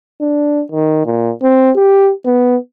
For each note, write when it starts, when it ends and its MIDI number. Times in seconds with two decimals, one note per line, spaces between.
0.21 0.63 62
0.72 1.03 51
1.05 1.32 46
1.43 1.71 60
1.76 2.12 67
2.25 2.56 59